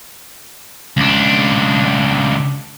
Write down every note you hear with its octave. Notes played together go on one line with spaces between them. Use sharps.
C#2 D4